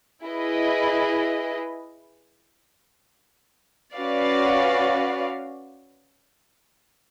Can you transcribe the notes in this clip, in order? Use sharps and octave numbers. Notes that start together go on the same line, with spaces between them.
E4 G#4 B4 D#5
C#4 F#4 B4 D5 F5